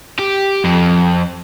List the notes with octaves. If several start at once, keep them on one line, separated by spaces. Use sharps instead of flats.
G4
F2